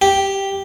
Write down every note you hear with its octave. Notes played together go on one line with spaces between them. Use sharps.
G4